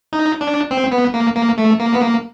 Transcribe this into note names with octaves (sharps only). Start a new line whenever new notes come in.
D#4
D4
C4
B3
A#3
A#3
A3
A#3
B3
A#3